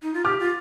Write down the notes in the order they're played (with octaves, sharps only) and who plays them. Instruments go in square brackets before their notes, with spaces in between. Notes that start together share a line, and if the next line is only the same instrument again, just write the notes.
[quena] D#4
F4
[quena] G4 [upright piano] D6 F6
[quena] F4